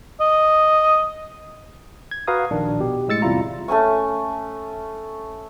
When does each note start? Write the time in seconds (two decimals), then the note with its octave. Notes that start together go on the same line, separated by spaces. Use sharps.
0.21 D#5
2.11 G#6
2.28 F#4 B4 F5 F#5 A#5 D#6
2.51 A#1 D#3 D4
2.80 B2 G4
3.08 A2 G#3 E6 A6 C#7
3.22 E2 C3 G3 E4 F4 A#5
3.68 A3 C#4 G#5 C#6